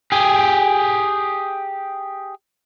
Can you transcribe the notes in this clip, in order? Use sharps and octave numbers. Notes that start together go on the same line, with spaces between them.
G4 G#4